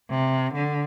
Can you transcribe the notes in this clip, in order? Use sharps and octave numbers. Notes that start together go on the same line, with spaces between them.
C3
D3